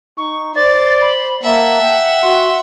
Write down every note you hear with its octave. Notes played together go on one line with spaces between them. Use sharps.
D#4 C#6
C5 D5 A6
B5
A#3 E5 F#5 A5
G5
F#4 C6